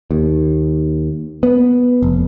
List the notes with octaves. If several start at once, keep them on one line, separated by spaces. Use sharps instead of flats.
D#2
B3
F1